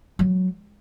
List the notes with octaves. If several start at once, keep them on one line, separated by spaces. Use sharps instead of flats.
F#3